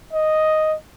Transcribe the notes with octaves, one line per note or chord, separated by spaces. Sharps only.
D#5